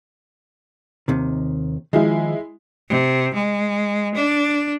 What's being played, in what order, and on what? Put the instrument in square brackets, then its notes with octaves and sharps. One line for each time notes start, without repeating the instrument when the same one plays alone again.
[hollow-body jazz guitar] D#2 C3 D#3
[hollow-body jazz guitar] D#3 F3 [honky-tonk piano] G#3 E4
[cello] C3
G#3
D4